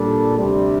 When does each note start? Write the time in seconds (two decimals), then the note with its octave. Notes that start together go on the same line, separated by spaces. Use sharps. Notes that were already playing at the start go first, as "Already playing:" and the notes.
Already playing: A#2 G3 D4 A4
0.37 D2 C3 G3